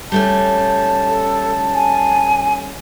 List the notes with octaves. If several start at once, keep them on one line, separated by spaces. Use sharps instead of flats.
G3 A3 C#4 A5
A4
G#5